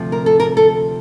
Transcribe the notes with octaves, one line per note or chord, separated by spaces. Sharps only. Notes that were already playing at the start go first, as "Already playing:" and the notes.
Already playing: D2 C3 F3
A#4
A4
A#4
A4